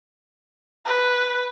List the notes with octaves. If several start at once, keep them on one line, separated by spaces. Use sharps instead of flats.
B4